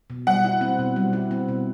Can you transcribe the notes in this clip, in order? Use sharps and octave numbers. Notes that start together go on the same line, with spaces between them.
B2
G3 F#5
E4
C4
B2
G3
E4
C4
B2